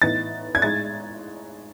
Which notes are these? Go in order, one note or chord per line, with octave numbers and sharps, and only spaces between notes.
A2 E3 B3 D#4 A6
G#6
A2 G#3 D#4 A6